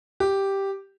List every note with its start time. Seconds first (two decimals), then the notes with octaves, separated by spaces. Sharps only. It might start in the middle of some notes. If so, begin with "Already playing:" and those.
0.20 G4